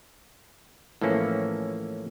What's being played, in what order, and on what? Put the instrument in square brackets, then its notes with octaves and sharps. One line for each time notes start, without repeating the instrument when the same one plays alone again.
[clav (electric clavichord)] A2 E3 F3 A#3 C#4